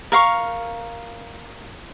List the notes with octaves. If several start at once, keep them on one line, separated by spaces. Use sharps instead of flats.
A#4 F5 C#6